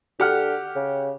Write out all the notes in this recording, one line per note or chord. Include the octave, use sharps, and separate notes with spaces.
D3 G4 F#5 F6
C#3